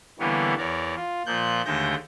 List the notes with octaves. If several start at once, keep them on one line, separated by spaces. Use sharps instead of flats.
D3 E3 G3 A#3 B3 C#5
E2 A#4 C#5 D5
F4
A#2 F3 F#6 G6
D#2 D3 G#3 A3 G6 A#6